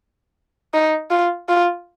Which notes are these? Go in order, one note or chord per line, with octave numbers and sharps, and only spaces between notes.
D#4
F4
F4